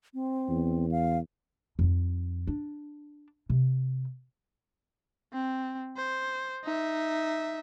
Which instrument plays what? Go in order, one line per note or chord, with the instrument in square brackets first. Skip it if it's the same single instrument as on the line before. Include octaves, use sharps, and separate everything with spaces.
[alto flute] C4
[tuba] E2
[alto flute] F5
[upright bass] F2 D#4
D4
C3
[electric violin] C4
C5
D#4 E5